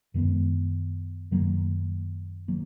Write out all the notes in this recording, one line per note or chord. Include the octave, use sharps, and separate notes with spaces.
F#2 D#3 G#3 B3
F#2 D#3 F#3 A#3
D#3 F#3 A#3